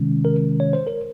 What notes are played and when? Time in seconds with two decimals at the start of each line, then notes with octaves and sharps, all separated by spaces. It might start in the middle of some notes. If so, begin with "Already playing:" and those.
Already playing: C3 D#3 G#3 C#4
0.25 A#4
0.60 C#5
0.73 C5
0.87 A#4